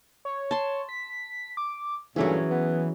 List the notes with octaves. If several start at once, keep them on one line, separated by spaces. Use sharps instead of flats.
C#5
A5 C6
B6
D6
G2 A#2 E3 F#3 A3 C#4 G#4
B3